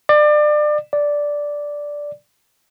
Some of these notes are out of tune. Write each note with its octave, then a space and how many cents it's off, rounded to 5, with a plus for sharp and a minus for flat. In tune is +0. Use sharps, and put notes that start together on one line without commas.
D5 +30
D5 -5